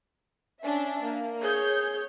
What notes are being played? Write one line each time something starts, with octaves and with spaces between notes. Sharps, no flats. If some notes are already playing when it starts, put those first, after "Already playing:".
C#4 D4 E5
A#3
G#4 C#5 G6